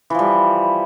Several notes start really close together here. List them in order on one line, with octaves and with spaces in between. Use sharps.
E3 F3 G3